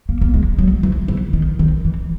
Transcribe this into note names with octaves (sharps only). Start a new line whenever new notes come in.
A#3
A#3
G#3
F#3
E3
E3
D#3
D#3
E3